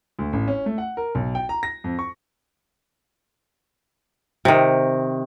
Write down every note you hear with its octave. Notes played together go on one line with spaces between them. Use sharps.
D2
A1
C#4
A3
F#5
A#4
B1
G5
A#5
A#6
F2
C#6
C3 D#3